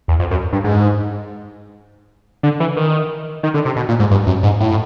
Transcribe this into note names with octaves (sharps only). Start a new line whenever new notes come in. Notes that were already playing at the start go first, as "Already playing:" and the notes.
E2
F2
F#2
G2
G#2
D3
E3
D#3
D#3
D3
C3
B2
A#2
G#2
G2
F#2
G#2
A2